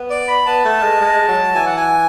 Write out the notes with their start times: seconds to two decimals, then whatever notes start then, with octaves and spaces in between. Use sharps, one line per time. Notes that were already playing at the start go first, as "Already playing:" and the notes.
Already playing: B3
0.10 D5
0.28 B5
0.46 B3 A5
0.65 A3
0.83 G#3
1.01 G#3
1.28 F#3
1.55 E3 G#5
1.66 F#5
1.76 G#5